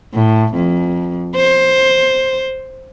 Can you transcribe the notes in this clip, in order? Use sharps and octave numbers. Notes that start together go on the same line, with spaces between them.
A2
F2
C5